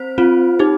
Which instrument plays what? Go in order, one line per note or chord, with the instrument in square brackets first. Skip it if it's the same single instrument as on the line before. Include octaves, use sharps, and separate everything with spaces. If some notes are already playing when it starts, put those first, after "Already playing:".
Already playing: [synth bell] C4 C5
[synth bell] C4 [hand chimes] F4
[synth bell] D#4 [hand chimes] G4